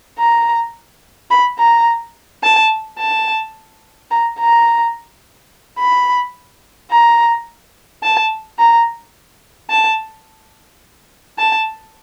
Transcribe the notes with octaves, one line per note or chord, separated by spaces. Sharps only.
A#5
B5
A#5
A5
A5
A#5
A#5
B5
A#5
A5
A#5
A5
A5